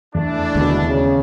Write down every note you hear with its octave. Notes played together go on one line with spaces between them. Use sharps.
E2 E3 A3 D4
D#2 B2 D3 G#3
C#3